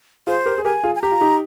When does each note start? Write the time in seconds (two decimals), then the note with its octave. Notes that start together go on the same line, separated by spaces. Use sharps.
0.27 F4 G#4 C5
0.46 G4 A#4
0.58 G#4
0.64 G4 A#4 G#5
0.84 F4 G#4
0.95 G#5
1.02 G4 A#5
1.12 F4
1.21 D#4 G4